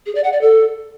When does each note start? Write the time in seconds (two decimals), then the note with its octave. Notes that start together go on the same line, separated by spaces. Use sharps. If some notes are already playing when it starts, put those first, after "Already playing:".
0.06 G#4
0.15 D5
0.24 F#5
0.33 D5
0.41 A4